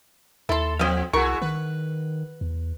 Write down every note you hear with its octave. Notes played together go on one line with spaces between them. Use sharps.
D#2 E4 A4 C6
F3 C4 D#5 F5
C2 G#3 E4 F#4 A#4 C#6
D#3 B4
E2